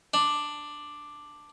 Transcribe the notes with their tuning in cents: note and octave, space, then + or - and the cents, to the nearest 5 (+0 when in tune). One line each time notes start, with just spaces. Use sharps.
D4 +5